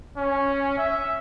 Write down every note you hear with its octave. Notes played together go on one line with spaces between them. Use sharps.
C#4
E5